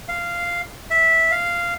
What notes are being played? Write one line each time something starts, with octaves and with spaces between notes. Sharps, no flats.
F5
E5
F5